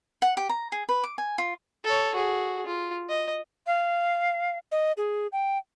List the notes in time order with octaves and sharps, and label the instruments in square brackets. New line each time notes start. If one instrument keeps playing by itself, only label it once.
[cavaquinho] F#5
G4
A#5
G#4
B4
D6
G#5
F4
[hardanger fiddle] A4 C#5
F#4 G#4
F4
D#5
[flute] F5
[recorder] D#5
G#4
G5